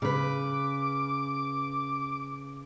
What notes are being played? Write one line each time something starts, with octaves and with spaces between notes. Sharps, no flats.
C#3 B4 D6